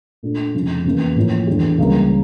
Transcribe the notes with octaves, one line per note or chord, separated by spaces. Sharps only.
A#2 A3 D4
F1 F2 C#3
E2 C#3 E3 A#3
A2 F3 A#3 E4
E2 E3 A3 D4 G4
C#2 C#3 G3 A#3